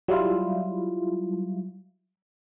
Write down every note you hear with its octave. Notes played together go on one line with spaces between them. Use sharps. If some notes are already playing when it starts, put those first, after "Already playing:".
F#3 G3 E4 F4